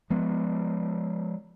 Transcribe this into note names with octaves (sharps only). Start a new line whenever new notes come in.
F3 G#3 B3